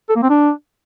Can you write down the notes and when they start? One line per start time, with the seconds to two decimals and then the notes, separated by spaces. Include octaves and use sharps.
0.09 A4
0.16 A#3
0.23 C4
0.29 D4